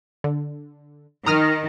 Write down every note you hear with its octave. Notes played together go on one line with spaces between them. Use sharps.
D3
D#3 A#5 D#6 F6